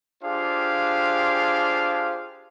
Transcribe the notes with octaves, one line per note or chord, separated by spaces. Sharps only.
D4 F4 G4 G#4 C5 F5